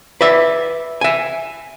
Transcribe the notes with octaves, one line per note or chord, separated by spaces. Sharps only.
B4 D5 E5
E5 G#5